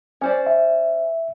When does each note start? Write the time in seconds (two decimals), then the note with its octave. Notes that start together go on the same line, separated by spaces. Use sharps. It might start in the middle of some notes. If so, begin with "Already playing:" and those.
0.21 C#4 C5 D5
0.47 E5